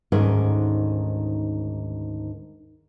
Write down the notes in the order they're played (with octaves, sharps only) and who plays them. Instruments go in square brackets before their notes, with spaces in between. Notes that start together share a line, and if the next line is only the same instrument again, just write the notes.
[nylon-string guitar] D2 G#2 D#3 C#4 G#4